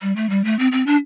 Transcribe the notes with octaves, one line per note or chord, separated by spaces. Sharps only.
G3
A3
G3
A3
C4
C4
D4